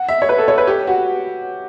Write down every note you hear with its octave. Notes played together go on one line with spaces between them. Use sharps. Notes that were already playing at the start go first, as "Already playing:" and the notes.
Already playing: F#5
E5
C#5
B4
A4
C#5
B4
G4
F#4